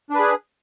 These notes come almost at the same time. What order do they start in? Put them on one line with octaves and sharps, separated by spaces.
D4 B4 G#4